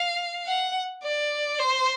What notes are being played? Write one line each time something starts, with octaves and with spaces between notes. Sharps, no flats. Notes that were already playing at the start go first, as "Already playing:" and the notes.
Already playing: F5
F#5
D5
C5